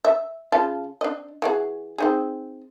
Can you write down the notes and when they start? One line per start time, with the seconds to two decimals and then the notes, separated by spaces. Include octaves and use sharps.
0.05 E5
0.52 C#3 F4 A5
1.01 D4 D#5
1.42 E3 F#4 G#4
1.98 C4 D#4 G#4